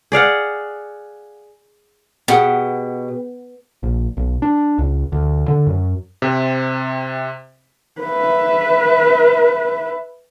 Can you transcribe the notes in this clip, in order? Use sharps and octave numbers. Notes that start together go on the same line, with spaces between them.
G#4 D5 F5 F#5
B2 G4 G#4 F#5
A#1
B1
D4
C#2
D2
D3
F#2
C3 C4
B4 E5